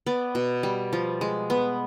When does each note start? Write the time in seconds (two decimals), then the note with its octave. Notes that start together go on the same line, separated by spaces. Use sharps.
0.06 B3 D5
0.35 B2
0.63 G3
0.93 F3
1.21 G#3
1.50 B3